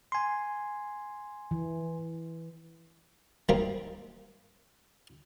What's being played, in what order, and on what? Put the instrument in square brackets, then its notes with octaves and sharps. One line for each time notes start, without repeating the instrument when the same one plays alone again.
[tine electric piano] G#5 C6
[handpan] E3
[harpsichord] D#3 G3 A#3 C4 A#5